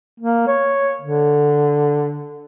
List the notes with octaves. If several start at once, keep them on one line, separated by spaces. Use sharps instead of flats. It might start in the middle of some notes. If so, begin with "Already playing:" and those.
A#3
C#5
D3